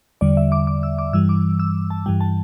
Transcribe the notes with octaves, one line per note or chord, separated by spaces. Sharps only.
E2 D3 G3 D5
E5
D6
D6
E6
D6
G2 E3 G3 E6
D6
E6
A5
G2 E3 G3 G5
A5